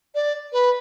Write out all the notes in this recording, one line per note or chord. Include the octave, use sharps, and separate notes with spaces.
D5
B4